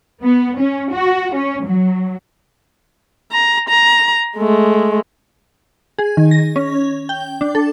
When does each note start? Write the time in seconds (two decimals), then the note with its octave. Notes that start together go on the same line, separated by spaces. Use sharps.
0.23 B3
0.58 C#4
0.92 F#4
1.34 C#4
1.66 F#3
3.32 A#5
3.69 A#5
4.37 G#3 A3
5.99 G#4
6.17 D#3
6.31 A#6
6.56 C#4
7.09 G5
7.41 D4
7.55 A4